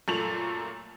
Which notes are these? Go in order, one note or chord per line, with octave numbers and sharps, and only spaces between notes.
F#2 A#2 A3 A5 F7 F#7